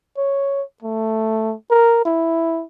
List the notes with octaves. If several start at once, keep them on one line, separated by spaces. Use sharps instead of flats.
C#5
A3
A#4
E4